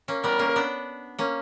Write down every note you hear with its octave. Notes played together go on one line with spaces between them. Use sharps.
A#3 C#4
G3 B3 A#4
A#3 C#4
B3 D4
A#3 C#4